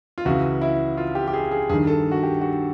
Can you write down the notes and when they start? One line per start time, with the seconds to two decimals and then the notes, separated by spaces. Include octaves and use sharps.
0.18 F4
0.25 C#2 C#3 E3 F#4
0.61 E4
0.97 F4
1.15 G4
1.28 G4
1.33 G#4
1.51 G#4
1.69 G2 G#4
1.73 D#3
1.87 A4
2.12 F#4
2.23 G4
2.41 F#4